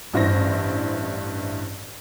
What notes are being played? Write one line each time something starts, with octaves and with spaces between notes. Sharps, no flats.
A1 G2 E4 C5 A#6